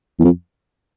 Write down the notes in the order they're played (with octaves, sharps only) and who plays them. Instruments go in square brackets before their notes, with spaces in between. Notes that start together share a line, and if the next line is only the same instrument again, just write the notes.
[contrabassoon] E2
F2